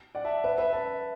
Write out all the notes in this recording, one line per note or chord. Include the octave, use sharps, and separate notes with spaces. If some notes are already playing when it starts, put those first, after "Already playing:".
D5 F#5
E5 A5
B4 E5
B4 E5
E5 A5